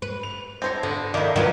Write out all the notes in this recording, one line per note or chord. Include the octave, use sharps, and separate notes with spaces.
B4
F7
C4 C5 C#5 A5 A#6
D3 B3
D#3 D4 E4 G4 D#5 F5
D#3 F3 F#3 C#4 B4